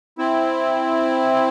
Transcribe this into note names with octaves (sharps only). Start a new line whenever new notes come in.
C4 E4